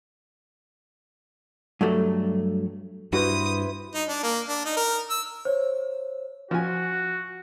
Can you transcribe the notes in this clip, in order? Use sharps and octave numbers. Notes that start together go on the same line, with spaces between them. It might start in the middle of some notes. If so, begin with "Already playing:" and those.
G2 F#3 A3
G2 E4 F#4 B4 C5 D#6
D#4
D4
A#3
D4
D#4
A#4
E6
C5 C#5
F3 F#4 G#5